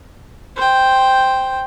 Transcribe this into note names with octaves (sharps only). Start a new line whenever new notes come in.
C5 G5